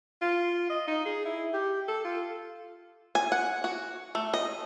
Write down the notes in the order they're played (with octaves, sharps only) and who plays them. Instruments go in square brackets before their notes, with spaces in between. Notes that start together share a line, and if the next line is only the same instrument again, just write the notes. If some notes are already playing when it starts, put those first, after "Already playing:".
[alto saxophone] F4
D#5
D#4
G#4
E4
G4
A4
F4
[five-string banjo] G#5
F#5
F#4
A3
D#5